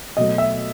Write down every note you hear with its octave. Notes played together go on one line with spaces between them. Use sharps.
B2 F#3 A3 D#5
E5